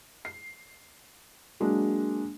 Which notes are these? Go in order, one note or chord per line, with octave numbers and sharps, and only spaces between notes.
C7
F#3 G#3 A#3 D4